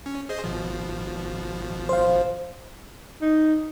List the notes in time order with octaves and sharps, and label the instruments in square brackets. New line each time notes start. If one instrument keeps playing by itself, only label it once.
[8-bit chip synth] C#4
G#4 C5 D#5
G#1 B2 F3
[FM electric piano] C5 F5
[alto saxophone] D#4